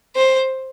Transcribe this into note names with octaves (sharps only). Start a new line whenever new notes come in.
C5